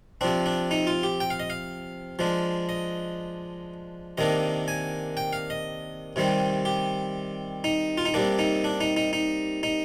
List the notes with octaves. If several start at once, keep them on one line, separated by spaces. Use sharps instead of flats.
C3 F3 C4 D4
D4
D#4
F4
G4
G5
F5
D#5
F5
F3 G#3 D4
D#5
C3 D#3 A#3 D4 D#5
G#5
G5
F5
D#5
C3 D#3 G3 C4
G4
D#4
F4
D#4
C3 G3 A#3 D4
D#4
D4
D#4
D#4
D#4
D#4